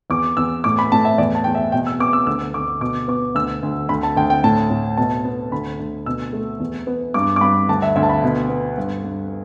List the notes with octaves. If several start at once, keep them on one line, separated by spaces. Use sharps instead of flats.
E2 D6
E2 E6
A2 D6
B5
A2 A5
E5
E2 D5
A5
E2 G5
E5
B2 G5
E6
B3 D6
E6
D2 E6
D2 D6
B2 D6
B3 D6
D2 E6
D2
D2 B5
A5
D2 G5
G5
A2 A5
A2
B2 A5
B3
D2 B5
D2
B2 E6
A3
E2
B3
G2 D6
D6
G2 B5
D2 A5
E5
D2 E5
A5
B5
B2
B3
G2
G2